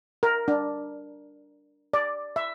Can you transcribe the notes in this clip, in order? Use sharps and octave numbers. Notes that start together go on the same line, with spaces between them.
A#4
D4
D5
E5